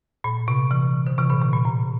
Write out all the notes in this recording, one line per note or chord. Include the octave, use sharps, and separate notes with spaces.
A#2
C3
C3 E3
D3
C3 E3
A#2 D3
C3
A#2
A2